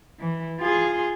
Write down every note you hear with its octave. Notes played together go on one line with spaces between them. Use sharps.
E3
F4 G#4